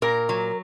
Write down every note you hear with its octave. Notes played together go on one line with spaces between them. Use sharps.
A#2 A#4
F#3